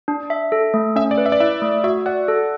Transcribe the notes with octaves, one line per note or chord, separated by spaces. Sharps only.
D4
E5
A4
A3
C#4 E5
D5
B4
E5
D5
E4 E5
A3
F#4 E5
D5 F#5
A4